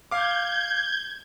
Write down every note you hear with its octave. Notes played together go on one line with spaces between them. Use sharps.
F5 D6 G6 G#6